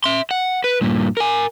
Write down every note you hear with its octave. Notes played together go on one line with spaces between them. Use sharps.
E5 C6
F#5
B4
G2 A#2
A#4 G#5